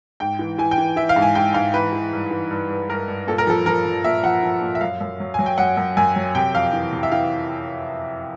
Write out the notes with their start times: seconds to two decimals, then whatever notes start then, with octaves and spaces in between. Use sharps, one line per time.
0.20 G#2 G5
0.39 E3
0.58 E3 G#5
0.71 G5
0.78 E3
0.96 E3 E5
1.09 F5
1.16 G#2
1.22 G#5
1.35 G#2 G5
1.54 G#2 F5
1.74 E3 B4
1.93 E3
2.13 G2
2.31 E3
2.51 G2
2.70 G2
2.89 G2 A#4
3.08 G2
3.27 A#2 A4
3.38 A#4
3.47 F3 A4
3.66 F3 A#4
3.85 F3
4.04 A#2 E5
4.23 F3 F#5
4.43 F3
4.61 A#2
4.75 E5
4.81 F#2 F5
5.01 F#2
5.20 F#3
5.34 F#3 G#5
5.46 G5
5.58 F#2 F#5
5.77 F#2
5.97 F#2 G#5
6.16 F#3
6.35 C3 G5
6.54 F2 F5
6.73 E3
6.93 C3
7.03 E5
7.12 E3 F5